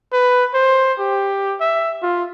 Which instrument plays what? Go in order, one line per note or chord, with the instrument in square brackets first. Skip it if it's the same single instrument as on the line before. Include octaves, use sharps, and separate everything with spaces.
[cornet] B4
C5
G4
E5
F4